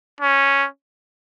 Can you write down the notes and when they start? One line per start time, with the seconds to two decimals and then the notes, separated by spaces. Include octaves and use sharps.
0.21 C#4